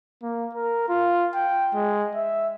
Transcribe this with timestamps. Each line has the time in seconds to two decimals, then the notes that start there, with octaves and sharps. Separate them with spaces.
0.22 A#3
0.54 A#4
0.89 F4
1.34 G5
1.74 G#3
2.15 E5